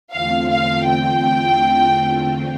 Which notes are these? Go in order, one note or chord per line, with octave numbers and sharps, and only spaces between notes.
E2 D3 A3 C4 F4 F5
F5
G5